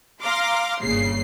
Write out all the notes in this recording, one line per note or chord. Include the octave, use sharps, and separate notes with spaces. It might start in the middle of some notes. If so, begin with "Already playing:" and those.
F5 A#5 C6 D6
G1 A#2 C#3 C7